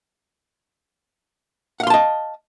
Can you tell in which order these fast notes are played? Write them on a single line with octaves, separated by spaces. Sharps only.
F#5 F5 C6 A5 D#5